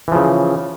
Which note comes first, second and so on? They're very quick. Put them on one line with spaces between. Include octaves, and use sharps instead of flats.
E3 F3 C#3